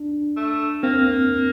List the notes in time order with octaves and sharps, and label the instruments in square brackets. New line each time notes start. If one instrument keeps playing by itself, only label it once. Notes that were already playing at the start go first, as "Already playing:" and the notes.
Already playing: [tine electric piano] D4
[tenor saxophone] A3
[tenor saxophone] A#3 [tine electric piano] C4